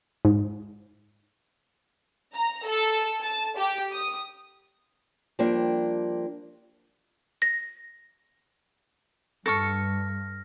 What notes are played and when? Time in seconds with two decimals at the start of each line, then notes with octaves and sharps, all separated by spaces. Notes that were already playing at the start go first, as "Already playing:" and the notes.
0.25 G#2
2.34 A#5
2.67 A4
3.22 A5
3.58 G4
3.92 D#6
5.39 F3 G3 A#3 D4 G4
7.42 A#6
9.46 G2 A4 C#6 F6 A#6